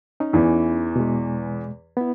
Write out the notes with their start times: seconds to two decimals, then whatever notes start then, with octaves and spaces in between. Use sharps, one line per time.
0.20 C#4 D#4
0.33 E2 E3
0.96 B2 G#3
1.97 B3 E4